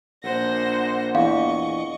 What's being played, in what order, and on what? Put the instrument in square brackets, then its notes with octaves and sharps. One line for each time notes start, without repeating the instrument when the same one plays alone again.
[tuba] A#1 [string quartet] C5 F#5 A#6
[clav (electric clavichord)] E2 [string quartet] D#5 C#6 [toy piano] F5